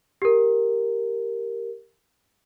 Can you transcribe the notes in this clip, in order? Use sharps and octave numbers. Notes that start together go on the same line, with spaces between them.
G4 A#4